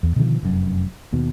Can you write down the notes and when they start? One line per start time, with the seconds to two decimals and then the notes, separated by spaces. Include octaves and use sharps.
0.03 E2
0.16 B2 D3 D#3 F3
0.43 F1 F#2
1.13 D#2 B2